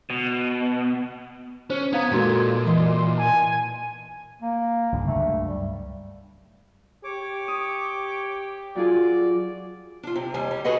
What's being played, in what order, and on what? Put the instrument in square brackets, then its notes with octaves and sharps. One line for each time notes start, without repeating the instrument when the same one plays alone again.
[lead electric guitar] B2
[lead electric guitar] C#4 [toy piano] C5
[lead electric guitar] B3 [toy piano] D#4 F5 A#5 [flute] G#6
[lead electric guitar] A#2 [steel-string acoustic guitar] G#3 A4 [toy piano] D#4 F#4 A#4
[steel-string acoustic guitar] E3 B4 D#5 [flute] C6
[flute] G#5 [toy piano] A5
[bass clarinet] A#3
[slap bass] C2 G2 C#3
[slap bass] C#2 G2 F#3 [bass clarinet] A3
[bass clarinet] G3
[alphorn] G4 [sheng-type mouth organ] C#5 D6
[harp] D#6
[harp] F#3 F4 G#4 [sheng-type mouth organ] D5
[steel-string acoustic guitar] D4 F4
C3
D#2 G3 G#5
G3
F#4 G#4 A4 B4 D#5 F#5